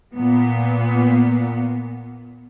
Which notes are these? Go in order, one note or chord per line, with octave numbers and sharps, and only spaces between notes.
A#2 B3